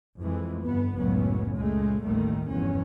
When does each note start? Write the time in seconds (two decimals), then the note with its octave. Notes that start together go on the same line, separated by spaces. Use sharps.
0.19 F2 E3 G#3
0.64 G1 B3
0.98 F#1 C#2 A2 F#3 B3 C#4
1.54 C#2 A#2 G#3 A3
2.04 A1 D#2 D#3 G3 A3
2.50 F1 E2 G2 E3 C#4